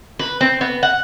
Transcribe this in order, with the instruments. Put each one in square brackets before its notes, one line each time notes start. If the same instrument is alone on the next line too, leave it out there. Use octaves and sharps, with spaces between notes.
[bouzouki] B4
C4
B3
F#5